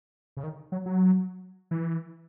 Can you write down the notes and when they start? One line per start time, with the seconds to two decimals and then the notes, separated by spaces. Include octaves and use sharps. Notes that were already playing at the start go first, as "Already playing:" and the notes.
0.37 C#3
0.43 D#3
0.72 F#3
0.86 F#3
1.71 E3